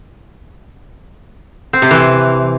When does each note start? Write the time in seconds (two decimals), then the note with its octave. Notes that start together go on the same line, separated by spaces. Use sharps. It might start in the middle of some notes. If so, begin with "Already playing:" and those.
1.73 C4
1.82 C3
1.91 E3